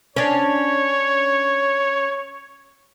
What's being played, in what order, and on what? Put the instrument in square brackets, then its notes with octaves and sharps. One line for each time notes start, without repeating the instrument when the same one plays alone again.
[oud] C#4 D4 [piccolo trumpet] C#5